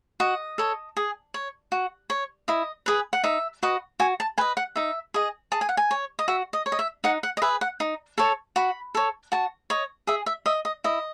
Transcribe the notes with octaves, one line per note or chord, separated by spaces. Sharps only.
F#4 D#5
A4 C#5
G#4
C#5
F#4
C#5
E4 D#5
G#4 B4
F#5
D#4 E5
F#4 B4 D#5
F#4 G#5
A5
B4 D#5 G#5
F#5
D#4 E5
G#4 D#5
G#4 A5
G#5
F#5
G#5
C#5
D#5
F#4 E5
D#5
C#5
D#5
E5
D#4 F#5
F#5
D#5
G#4 B4 E5
F#5
D#4
A4 C#5 A5
F#4 B5
A4 C#5
F#4 A5
C#5 D#5
G#4 E5
E5
D#5 E5
D#5
E4 D#5